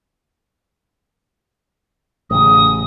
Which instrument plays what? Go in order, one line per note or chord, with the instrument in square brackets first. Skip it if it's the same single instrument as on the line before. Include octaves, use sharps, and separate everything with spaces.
[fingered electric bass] A1 C#3 [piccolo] D#6